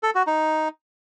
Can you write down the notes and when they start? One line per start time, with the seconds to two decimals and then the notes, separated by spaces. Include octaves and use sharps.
0.03 A4
0.15 F#4
0.27 D#4